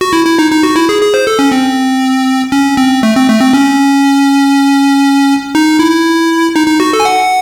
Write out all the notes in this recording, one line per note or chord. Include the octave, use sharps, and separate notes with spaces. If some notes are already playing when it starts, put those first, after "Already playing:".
F#4
E4
E4
D#4
D#4
F#4
E4
G#4
G#4
C5
A4
C#4
C4
C#4
C4
A3
C4
A3
C4
C#4
D#4
E4
D#4
D#4
F#4
A4
G#5
F#5